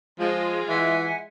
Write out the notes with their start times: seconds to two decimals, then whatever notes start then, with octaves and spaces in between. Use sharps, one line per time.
0.19 F3 G#3 F4
0.69 E3 E5 F#5 G#5